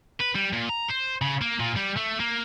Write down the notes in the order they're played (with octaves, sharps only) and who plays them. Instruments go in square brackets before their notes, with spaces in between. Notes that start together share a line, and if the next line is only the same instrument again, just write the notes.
[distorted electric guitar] B4
G3
A#2
A#5
C5
C#3
A#3
A#2
G3
A3
A#3